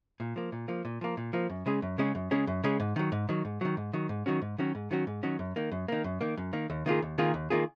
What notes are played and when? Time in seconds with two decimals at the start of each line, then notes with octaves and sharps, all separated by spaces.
0.20 A#2
0.36 F3 A#3
0.52 A#2
0.68 F3 A#3
0.85 A#2
1.01 F3 A#3
1.17 A#2
1.33 F3 A#3
1.50 F#2
1.66 C#3 G#3 C#4 G#4
1.82 F#2
1.98 C#3 G#3 C#4 G#4
2.15 F#2
2.31 C#3 G#3 C#4 G#4
2.47 F#2
2.64 C#3 G#3 C#4 G#4
2.80 G#2
2.96 D#3 F#3
3.12 G#2
3.29 D#3 F#3
3.45 G#2
3.61 D#3 F#3
3.77 G#2
3.93 D#3 F#3
4.09 G#2
4.26 D#3 F#3 C#4 F#4
4.42 G#2
4.58 D#3 F#3 C#4 F#4
4.75 G#2
4.91 D#3 F#3 C#4 F#4
5.07 G#2
5.23 D#3 F#3 C#4 F#4
5.39 F#2
5.56 D#3 A#3
5.72 F#2
5.88 D#3 A#3
6.04 F#2
6.21 D#3 A#3
6.37 F#2
6.53 D#3 A#3
6.70 D#2
6.86 D#3 A#3 F4 G#4
7.02 D#2
7.18 D#3 A#3 F4 G#4
7.34 D#2
7.50 D#3 A#3 F4 G#4